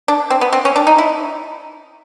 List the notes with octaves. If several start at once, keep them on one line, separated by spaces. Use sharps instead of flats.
D4
C4
B3
C4
C#4
D4
D#4
E4